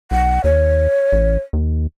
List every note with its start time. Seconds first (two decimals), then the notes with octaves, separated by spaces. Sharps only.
0.11 B1 F#5
0.44 D#2 C#5
1.13 A1
1.53 D#2